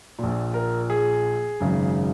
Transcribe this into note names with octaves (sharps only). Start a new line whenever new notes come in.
A#1 A#2
A#4
G#4
G#1 F#2 C#3